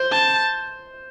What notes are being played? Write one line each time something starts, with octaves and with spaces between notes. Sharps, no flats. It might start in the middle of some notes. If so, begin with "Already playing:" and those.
Already playing: C5
A5